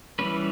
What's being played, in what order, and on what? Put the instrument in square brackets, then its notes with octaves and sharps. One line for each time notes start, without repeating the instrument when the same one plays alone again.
[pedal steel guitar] E3 G3 C#4 B4